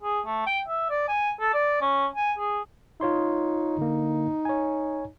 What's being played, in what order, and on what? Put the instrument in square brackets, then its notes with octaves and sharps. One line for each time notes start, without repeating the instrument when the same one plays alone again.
[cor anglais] G#4
A3
G5
E5
D5
G#5
A4
D5
C#4
G#5
G#4
[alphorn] D#4 [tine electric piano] F4 C#5 C6
[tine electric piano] D3 A#3
C#5 G#5